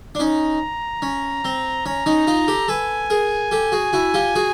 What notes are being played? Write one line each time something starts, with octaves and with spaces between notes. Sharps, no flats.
D4
C#4 D#4 A#5
C#4
C4
C#4 A#5
C#4 D#4
D#4 F4
G4 A4
A4 B4 G#5
G#4 A#4
G4 A4
F#4 G#4
E4 F#4
F4 G4
F#4 G#4